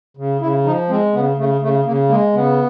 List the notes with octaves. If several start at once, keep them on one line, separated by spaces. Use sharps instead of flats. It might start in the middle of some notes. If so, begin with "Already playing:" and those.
C#3
C#3 E4
F3 D#4
G#3 C4
C#3 B3
C#3 A3
C#3 A3
C#3 A#3
G#3 A#3
C#3 B3